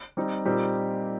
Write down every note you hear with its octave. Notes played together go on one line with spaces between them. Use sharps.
G3 C4 D#4
A#2 G3 C4 D#4 G4